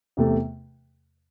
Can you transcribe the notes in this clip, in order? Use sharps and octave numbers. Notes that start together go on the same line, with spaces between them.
E2 C3 A3